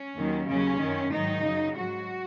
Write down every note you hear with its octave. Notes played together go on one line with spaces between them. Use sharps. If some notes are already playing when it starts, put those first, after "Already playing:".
Already playing: C#4
D#2 D#3 F#3
D#2 C#3 F#3 C#4
F#2 D#3 F#3
G#2 D#3 F#3 D#4
F#2 C#3 F#3
G#2 F#3 F#4